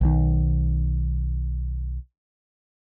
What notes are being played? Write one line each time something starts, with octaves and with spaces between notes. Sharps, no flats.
B1 D#3